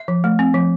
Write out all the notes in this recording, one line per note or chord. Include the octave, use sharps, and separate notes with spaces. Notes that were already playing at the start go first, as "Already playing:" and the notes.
Already playing: E5
F3
A3
C4
F3